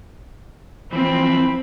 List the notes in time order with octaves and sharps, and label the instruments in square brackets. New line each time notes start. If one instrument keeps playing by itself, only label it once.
[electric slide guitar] E3 F3 [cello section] C4 [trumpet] B5